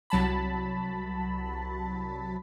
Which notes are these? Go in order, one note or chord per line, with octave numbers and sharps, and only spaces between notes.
C2 F#3 A5 B5